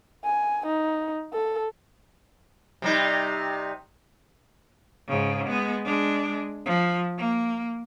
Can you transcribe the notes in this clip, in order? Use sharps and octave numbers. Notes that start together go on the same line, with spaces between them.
G#5
D#4
A4
C3 G3 D#4
G#2 C#3
G#3 B3
G#3 D4
F3
A#3